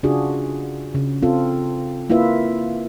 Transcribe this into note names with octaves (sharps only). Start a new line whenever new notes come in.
C#3 D4 F4 F#4 G#4
C#3
C4 F4 A4
A#3 E4 F4 B4 E5